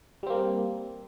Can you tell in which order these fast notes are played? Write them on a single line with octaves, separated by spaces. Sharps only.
G3 C4 A#3